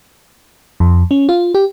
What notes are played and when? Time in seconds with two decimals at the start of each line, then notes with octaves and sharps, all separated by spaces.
0.80 F2
1.11 C#4
1.29 F4
1.55 G4